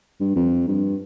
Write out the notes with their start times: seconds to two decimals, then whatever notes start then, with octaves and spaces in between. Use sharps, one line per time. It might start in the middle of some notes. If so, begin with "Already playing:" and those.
0.20 G2
0.36 F2
0.67 G2